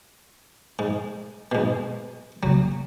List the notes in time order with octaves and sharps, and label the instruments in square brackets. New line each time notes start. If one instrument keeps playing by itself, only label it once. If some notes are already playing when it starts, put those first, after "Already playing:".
[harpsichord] G#2
G#2 B2
[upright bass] C#3 A#3 [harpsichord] F#3